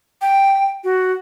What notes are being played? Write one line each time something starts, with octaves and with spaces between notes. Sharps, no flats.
G5
F#4